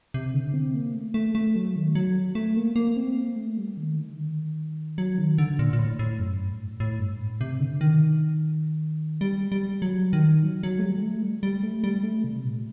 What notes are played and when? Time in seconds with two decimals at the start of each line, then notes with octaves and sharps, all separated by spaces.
0.14 C3
0.34 D3
0.54 C4
0.74 A#3
0.94 A3
1.14 A3
1.35 A3
1.56 F#3
1.76 D#3
1.95 F#3
2.35 A3
2.57 A#3
2.76 A#3
2.96 C4
3.16 A#3
3.36 A3
3.57 G3
3.77 D#3
3.97 D3
4.17 D#3
4.98 F#3
5.18 D#3
5.38 D3
5.59 A#2
5.73 A#2
5.79 A2
5.99 A2
6.19 F#2
6.39 G2
6.59 A2
6.80 A2
6.99 G2
7.20 A2
7.41 C3
7.60 D3
7.81 D#3
9.21 G3
9.52 G3
9.82 F#3
10.13 D#3
10.43 F#3
10.63 F#3
10.79 A3
10.83 G3
11.03 A3
11.23 G3
11.43 G3
11.63 A3
11.84 G3
12.03 A3
12.24 C3
12.44 A#2